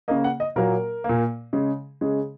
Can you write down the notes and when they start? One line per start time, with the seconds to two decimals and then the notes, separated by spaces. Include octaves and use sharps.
0.08 C#3 A#3 D#5
0.24 F#5
0.40 D#5
0.56 A#2 F#3 A#3 A#4
1.04 A#2 A#3
1.53 C#3 G#3
2.01 C#3 G#3